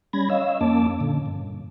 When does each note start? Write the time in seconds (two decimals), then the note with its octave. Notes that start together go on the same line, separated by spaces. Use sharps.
0.13 G3 C#4 B5 G#6 A#6
0.30 C#5 D#5 F5 E6
0.61 F2 A#3 C#4 A5 D6
1.00 A#2 D3
1.26 G2